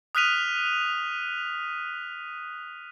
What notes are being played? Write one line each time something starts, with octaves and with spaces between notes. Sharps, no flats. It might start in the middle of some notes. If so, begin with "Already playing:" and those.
D#6 F6 F#6 B6 D#7 F7